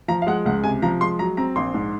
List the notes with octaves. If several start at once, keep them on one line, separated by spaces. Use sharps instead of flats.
F3 A#5
F5
G#3 F#5
C#2 F#5
C3 G#5
F3 A#5
G#3 C6
F#3 A#5
C4 A#5
A#1 C6
G#2